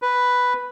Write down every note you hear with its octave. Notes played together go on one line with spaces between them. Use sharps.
B4